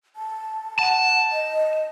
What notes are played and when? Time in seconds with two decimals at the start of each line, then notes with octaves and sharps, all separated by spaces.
0.16 A5
0.79 F#5 A5
1.32 D#5